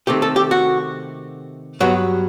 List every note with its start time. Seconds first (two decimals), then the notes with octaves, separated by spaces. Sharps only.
0.07 C3 D#3 A3 G4
0.22 A4
0.36 G4
0.51 F#4
1.80 G2 F#3 B3 F#4